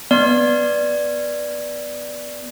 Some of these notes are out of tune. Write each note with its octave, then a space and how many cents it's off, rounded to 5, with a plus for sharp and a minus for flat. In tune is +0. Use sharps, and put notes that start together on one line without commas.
B3 +0 D5 +0